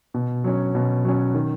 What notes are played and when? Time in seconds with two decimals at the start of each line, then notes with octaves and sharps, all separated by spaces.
0.14 B2
0.44 F#3 C#4
0.75 B2
1.05 F#3 C#4
1.34 D#3